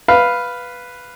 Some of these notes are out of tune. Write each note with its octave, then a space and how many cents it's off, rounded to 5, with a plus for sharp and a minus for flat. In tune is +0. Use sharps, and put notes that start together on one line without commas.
B4 +0 F5 +0